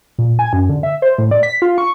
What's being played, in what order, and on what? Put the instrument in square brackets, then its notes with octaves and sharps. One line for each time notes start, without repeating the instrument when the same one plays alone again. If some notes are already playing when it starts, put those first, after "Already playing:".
[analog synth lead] A#2
G#5
F#2
D3
E5
C5
A2
D5
B6
F4
C#6